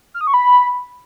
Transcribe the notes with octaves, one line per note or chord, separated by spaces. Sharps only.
F6
D#6
C#6
B5